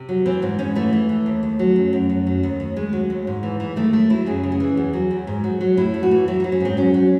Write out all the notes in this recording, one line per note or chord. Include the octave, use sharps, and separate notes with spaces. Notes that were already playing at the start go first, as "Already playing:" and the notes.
Already playing: C3
F#3
E3 C4
G#2 C4
G#2 C#4
E3 A3
E3
E3
D#2
D#2
F#3
F#2
F#2
F#2
F#3
D#2
D#2
D#2 G#3
F#3
D#2
G#2
E3
E3
D#3 A3
D#2 A3
F#3 E4
F#2 G#4
C#3
G#4
E3
E2
F#3
E2
G#2
F#3
F#3
A2 E4
A2
F#4
E3
F#3 E4
F#3 D#4
C#4
G#2 C4
F#3 C#4
F#3